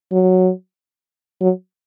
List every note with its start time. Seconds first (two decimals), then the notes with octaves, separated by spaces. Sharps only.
0.12 F#3
1.41 F#3